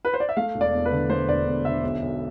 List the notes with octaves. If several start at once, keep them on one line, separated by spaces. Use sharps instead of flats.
B4
C5
D5
E5
A3 F5
E1
D5
E2
B4
D3
A3 C5
E1 D5
E2
D3 E5
B1
B1